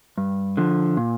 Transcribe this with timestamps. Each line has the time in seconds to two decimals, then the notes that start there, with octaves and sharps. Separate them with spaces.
0.18 G2
0.57 D3 F3
0.97 A#2